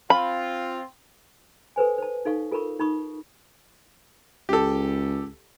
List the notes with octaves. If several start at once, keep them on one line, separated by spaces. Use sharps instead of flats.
C4 F4 B5
A4 B4 C5 G#5
C5 A5
D#4 A4 F5 C#6
F4 A4 A#4 B5 C#6
D#4 B5 C#6 D#6
C#2 G4 A4